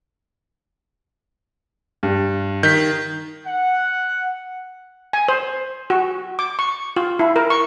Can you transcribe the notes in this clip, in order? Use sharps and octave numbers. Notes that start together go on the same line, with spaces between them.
G2
D#3 G6 B6
F#5
G#5
C5
F#4
D6
C#6
F4
E4
A#4
C#6